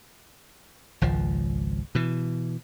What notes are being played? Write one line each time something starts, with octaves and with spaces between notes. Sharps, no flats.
G#1 C#2 F3
B2 E3